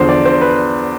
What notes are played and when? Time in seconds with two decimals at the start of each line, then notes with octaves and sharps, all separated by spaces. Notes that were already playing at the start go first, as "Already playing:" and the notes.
Already playing: E2 D3 F3 C5
0.09 D5
0.25 C5
0.41 B4